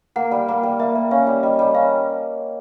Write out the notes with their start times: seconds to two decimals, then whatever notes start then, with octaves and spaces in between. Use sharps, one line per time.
0.16 A#3 F#5
0.31 G3
0.48 A#3
0.63 G3
0.79 A#3 E5
0.95 A#3
1.11 C#4 F5
1.27 G3
1.43 G3 D#5
1.59 G3
1.74 C#4 F5